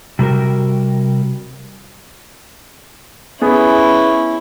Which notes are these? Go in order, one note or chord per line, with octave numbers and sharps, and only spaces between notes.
C3 G3 F#4 A#4
B3 C#4 E4 G#4